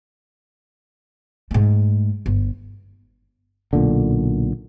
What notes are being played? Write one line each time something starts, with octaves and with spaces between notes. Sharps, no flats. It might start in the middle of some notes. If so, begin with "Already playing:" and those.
G#2 A3
G1
B1 A#2 D3